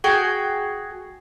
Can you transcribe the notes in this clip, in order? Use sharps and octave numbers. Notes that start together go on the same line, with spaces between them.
F#4 G#4 G5